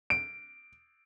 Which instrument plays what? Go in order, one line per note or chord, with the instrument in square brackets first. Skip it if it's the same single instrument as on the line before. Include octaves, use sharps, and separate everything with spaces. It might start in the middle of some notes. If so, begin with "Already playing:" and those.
[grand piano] D7